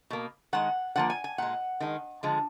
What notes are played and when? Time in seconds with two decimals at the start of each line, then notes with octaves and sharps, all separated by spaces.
0.10 B2 A#3
0.53 D#3 G#3 F#5
0.96 D3 F3 A#3 F#5
1.10 G#5
1.24 G#5
1.38 A#2 G#3 F#5
1.80 D#3 G#3
2.23 D3 F3 G#3